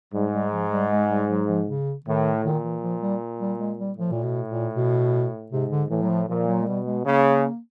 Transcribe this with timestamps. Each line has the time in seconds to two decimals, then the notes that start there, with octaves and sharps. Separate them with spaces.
0.13 G#2 G3
0.32 G3
0.52 F3
0.71 G3
0.90 G#3
1.09 G3
1.28 F#3
1.48 F3
1.67 C#3
2.05 A2 D#3
2.44 A#2 D#3
2.63 E3
2.82 F3
3.02 G3
3.40 G3
3.59 G#3
3.78 G3
3.98 A2 F3
4.12 A#2
4.23 B2
4.49 A#2
4.74 B2
5.51 G#2 C3
5.70 D3
5.90 A2 E3
6.02 F#3
6.09 F3
6.28 A#2 F3
6.47 F#3
6.62 G#3
6.66 B2 G3
6.86 G#3
7.05 C#3 A#3